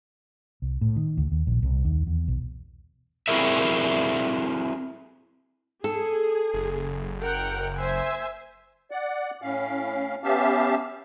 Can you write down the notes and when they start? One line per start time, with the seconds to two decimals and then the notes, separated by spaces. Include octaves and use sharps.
0.62 C2
0.81 A2
0.96 D#3
1.17 D2
1.32 D#2
1.47 A#1
1.63 C2
1.85 D#2
2.07 E2
2.28 B1
3.28 C4 E4 F#4 G#4 A#4 E5
5.84 G#4 A4
6.54 F#1
7.21 A#4 F#5 G5
7.78 C5 E5 G#5
8.91 D5 F#5
9.42 A2 C#4 F5
10.24 B3 C#4 G4 E5 F5 A5